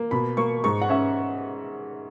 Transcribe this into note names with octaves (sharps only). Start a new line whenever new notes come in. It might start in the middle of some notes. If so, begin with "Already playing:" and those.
Already playing: A#3
B2 B5
A#3 C#6
G#2 C#6
F#5
C#4 E5